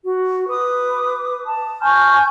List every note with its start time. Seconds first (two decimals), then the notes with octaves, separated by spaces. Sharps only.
0.04 F#4
0.49 B4 D6 D#6
1.45 A5
1.82 G#5 C#6 F6 G6